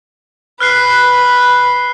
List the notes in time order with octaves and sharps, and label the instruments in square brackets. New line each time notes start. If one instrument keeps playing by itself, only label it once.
[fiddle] B4 [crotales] F6 F#6 C7